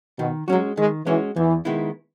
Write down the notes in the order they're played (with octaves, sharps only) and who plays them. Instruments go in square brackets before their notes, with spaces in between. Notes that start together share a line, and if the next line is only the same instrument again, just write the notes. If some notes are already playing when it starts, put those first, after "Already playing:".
[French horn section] B2 [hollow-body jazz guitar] D#3
[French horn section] F#3 [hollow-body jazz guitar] G#3 C#4 F#4
[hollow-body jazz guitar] D#3 [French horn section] G#3
[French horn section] E3 [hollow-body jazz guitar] G#3 C#4 F#4
[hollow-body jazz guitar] E2 [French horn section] E3
[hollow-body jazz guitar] D#3 G#3 B3 E4